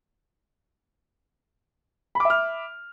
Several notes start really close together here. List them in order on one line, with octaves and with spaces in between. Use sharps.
B5 D6 E5 F6